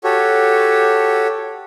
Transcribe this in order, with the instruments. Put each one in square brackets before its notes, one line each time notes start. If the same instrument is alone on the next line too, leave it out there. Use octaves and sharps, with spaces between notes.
[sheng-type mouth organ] F#4 G4 A4 C#5